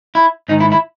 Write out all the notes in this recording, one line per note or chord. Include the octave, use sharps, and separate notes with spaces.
E4
G#2 D#3 D#4
E4
E4